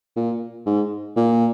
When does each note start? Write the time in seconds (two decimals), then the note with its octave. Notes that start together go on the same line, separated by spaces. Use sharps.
0.16 A#2
0.66 G#2
1.16 A#2